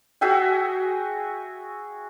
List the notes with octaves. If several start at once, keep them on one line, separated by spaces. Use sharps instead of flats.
F#4 G#4 E5 G5